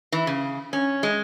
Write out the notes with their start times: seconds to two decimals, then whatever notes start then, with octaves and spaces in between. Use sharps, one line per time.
0.12 E3
0.27 C#3
0.73 C#4
1.03 G#3